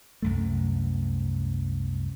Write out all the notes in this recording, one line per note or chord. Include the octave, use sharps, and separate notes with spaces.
C2 F#2 A3